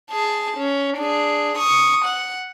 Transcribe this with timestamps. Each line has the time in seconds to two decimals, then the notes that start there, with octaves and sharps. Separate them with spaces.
0.11 G#4 A5
0.57 C#4
0.97 D4 G#4
1.58 C#6 D#6
2.05 F#5